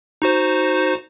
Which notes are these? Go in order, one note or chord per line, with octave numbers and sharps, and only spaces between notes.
D#4 F#4 C5